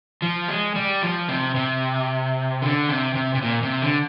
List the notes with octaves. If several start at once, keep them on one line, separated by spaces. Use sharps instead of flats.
F3
G#3
G3
F3
C3
C3
D3
C3
C3
C3
A#2
C3
D3